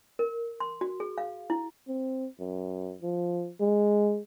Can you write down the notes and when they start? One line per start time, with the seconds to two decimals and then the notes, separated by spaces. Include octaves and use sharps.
0.19 A#4
0.60 C6
0.81 F#4
1.00 G#4
1.18 F5
1.50 E4
1.88 C4
2.40 F#2
3.02 F3
3.60 G#3